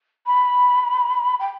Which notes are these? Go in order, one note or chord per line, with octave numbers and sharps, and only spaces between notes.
B5
G5